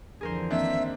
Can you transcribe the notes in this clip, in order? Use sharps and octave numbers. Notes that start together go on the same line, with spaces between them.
F2 D3 E3 G#4 A#4 C5
D#3 A#3 C4 D4 E5